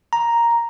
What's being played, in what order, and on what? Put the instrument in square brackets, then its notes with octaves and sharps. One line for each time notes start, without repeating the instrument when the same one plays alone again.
[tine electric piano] A#5